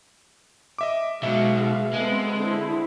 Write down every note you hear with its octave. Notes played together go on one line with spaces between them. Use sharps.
D#5 E5 D6
B2 F#3 G#3 E5 F5
G#3 B3 C4 A4
D3 C4 E4